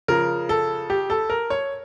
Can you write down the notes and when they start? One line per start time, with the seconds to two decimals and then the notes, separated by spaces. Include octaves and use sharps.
0.08 C#3 F3 A#4
0.49 A4
0.90 G4
1.10 A4
1.30 A#4
1.50 C#5